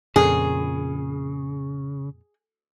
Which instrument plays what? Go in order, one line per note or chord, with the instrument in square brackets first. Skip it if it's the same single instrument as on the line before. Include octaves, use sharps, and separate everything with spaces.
[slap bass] F2 A#2 [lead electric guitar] C#3 [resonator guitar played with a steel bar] G#4